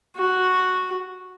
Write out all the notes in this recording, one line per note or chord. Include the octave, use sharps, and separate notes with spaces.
F#4